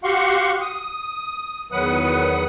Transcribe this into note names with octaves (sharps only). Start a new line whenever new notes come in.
F#4 G4 F5 F#5 C6 C#6
D#6
E2 D#3 F#3 B4 F#5 D#6